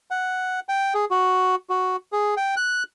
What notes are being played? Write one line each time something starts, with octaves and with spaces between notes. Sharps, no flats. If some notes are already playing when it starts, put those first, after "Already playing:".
F#5
G5
G#4
F#4
F#4
G#4
G5
F#6